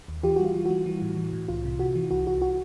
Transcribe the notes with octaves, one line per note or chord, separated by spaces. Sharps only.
D#2
E3 F4 G4
F#4
G3
F4
E3
G3 F#4
E3
A2
E3
A2
C2 F4
C3
C3 F#4
E3
C2 F#4
C2 F#4
F#4